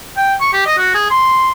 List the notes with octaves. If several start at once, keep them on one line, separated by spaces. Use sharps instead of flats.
G5
C#6
G4
D#5
F#4
G#4
C6